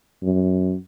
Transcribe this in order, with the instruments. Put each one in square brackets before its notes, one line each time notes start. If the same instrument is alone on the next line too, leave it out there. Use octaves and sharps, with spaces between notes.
[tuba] F#2